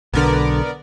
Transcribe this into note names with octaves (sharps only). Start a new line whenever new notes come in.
B1 D3 B3 A#4 D5